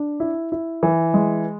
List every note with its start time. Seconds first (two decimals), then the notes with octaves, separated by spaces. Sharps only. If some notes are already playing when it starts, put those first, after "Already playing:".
Already playing: D4
0.20 E4
0.52 E4
0.83 E3
1.14 G#3